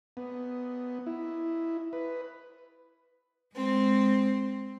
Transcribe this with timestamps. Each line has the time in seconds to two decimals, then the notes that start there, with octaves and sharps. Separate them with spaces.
0.17 B3
1.06 E4
1.93 B4
3.55 G#3 C4